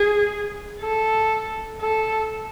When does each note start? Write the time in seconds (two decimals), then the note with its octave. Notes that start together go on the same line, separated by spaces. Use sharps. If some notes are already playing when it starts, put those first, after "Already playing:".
Already playing: G#4
0.81 A4
1.81 A4